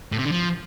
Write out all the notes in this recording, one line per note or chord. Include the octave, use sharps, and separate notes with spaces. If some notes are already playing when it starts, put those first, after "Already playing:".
A2
C3
D3
F3